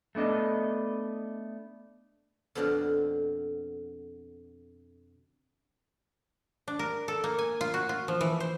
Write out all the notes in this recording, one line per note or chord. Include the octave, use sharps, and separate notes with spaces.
A3 B3 D4 D#5
F2 B2 D3 C4 D4 F4
D4
A#4
A4
A#3
G#5
F4
F#4
F4
F3
E3
C5